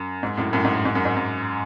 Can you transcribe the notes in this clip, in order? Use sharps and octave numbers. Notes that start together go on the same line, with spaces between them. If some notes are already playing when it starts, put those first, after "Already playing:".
Already playing: F#2
G#2
F#2 A2
F#2 A2
G#2
F#2
G#2
F#2
G#2
F#2